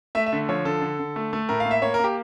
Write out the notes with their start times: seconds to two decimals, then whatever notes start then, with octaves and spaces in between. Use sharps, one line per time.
0.15 A3 E5
0.26 E5
0.33 D3
0.49 F3 C#5
0.65 D3 A4
0.82 D3
0.99 D3
1.16 A3
1.33 A3
1.49 A2 A#4
1.60 A#3 F5
1.71 E5
1.82 A#3 C#5
1.94 A#4
1.99 A#3 G4